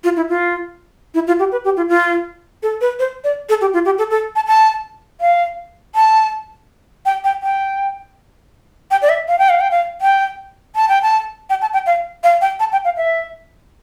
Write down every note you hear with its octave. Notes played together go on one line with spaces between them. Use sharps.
F4
E4
F4
E4
F4
G4
B4
G4
F4
F4
A4
B4
C5
D5
A4
G4
F4
G4
A4
A4
A5
A5
F5
A5
G5
G5
G5
G5
D5
E5
F5
G5
F5
G5
F5
G5
A5
G5
A5
G5
A5
G5
F5
F5
G5
A5
G5
F5
E5